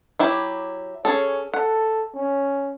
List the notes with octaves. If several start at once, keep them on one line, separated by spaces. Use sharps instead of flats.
F#3 E4 G4
C#4 G#4 A4 C#5
A4 F#5
C#4